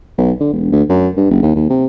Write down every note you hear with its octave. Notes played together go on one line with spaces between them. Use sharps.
B1
D3
E1
D2
F#2
G2
F#1
D#2
D#2
C3